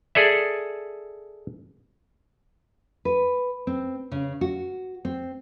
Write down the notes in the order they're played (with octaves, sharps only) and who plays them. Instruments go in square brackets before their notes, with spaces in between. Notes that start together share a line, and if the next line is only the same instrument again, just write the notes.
[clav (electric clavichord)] G#4 A4 D5 E5
[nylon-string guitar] B4
C4
C#3
F#4
C4